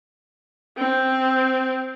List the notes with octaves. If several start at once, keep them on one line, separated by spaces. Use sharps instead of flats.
C4